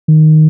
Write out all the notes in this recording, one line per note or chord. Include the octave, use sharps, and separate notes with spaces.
D#3